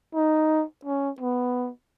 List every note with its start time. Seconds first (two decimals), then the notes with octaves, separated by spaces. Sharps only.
0.15 D#4
0.85 C#4
1.21 B3